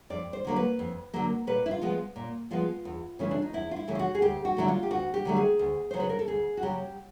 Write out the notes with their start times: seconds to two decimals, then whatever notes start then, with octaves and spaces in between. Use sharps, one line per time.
0.10 F2 D5
0.33 C5
0.45 D3 F#3 A#3
0.56 B4
0.79 F2
1.13 D3 F#3 A#3
1.47 A#2 B4
1.66 E4
1.71 F4
1.81 F3 G#3 B3
2.16 A#2
2.51 F3 G#3 B3 F4
2.85 E2
3.19 C#3 E3 A3 C#4
3.31 D4
3.42 D#4
3.53 E2 E4
3.71 F4
3.76 E4
3.87 C#3 E3 A3
3.95 F4
3.99 F#4
4.15 G#4
4.22 D2 G4
4.45 F#4
4.57 D3 F#3 A3 E4
4.68 F4
4.83 G4
4.91 D2 F#4
5.14 G4
5.25 D3 F#3 A3
5.36 G#4
5.59 D2
5.91 C#3 F#3 C5
6.00 B4
6.09 A#4
6.19 A4
6.28 D2 G#4
6.57 F#4
6.63 C#3 F#3 G4